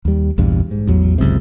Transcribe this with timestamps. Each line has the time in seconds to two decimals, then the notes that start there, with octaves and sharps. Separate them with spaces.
0.05 D#2 G3
0.38 A#1 E2 G2
0.71 G#2
0.87 A1 E2 F#3
1.18 G1 C#2 F#2 C3